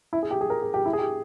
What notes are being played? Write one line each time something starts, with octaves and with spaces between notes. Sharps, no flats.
E4
G#4
G4
G#4
A#4
G#4
G4
E4
G#4
G4